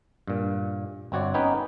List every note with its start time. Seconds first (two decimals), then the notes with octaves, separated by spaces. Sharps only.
0.28 G2 A#2
1.12 G1 C4 F#4 C#5 D5
1.34 B3 C#4 D#4 B4 G5 G#5